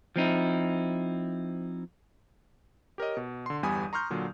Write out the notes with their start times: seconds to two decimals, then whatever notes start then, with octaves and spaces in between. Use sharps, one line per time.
0.16 F3 C4 D#4 E4
2.98 G4 A#4 C#5 D#5
3.17 B2
3.46 D3 C6
3.63 G1 E2 G3 G#5 B5 D#6
3.93 A#5 C6 C#6 F6 G6
4.10 A#2 D3 F#3